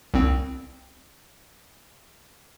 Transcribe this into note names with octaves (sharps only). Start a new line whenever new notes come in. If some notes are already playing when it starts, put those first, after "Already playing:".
C2 C4